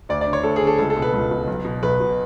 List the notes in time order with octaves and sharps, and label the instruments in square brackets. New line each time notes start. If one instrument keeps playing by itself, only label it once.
[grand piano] D2 D5
D5
D3
C#5
D2 A4
D3 G#4
A4
C#2 A4
A4
B2
B4
C#2
B2
B1
B2
B1 B4
B2